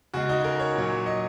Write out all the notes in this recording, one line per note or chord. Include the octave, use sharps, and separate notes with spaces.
C#3 G#3 F#4
D#4
A#4
C#5
A#2 F#3
D#5